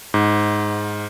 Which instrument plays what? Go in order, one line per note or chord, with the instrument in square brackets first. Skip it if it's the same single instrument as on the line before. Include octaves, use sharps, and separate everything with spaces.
[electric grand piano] G#2